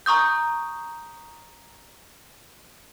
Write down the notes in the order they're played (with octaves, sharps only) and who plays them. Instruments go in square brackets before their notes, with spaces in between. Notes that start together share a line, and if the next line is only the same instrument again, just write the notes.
[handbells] A#5 C#6 D#6 G6